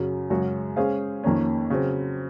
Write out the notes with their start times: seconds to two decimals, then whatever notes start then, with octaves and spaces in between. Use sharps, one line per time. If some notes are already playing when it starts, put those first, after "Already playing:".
Already playing: F#2 C#3 F#3
0.30 F#2 C#3 G#3 C#4 F#4
0.76 G#3 C#4 G#4 C5 F5
1.23 F2 D#3 A#3 C#4
1.70 C#3 F#3 C4